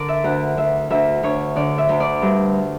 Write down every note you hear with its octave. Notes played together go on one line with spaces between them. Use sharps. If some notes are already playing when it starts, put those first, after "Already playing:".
Already playing: D3 A#4 D5
E5
D2 F#5
D2 E5
D2 E5
D2 C#5
D3 D5
E5
D2
D5
G2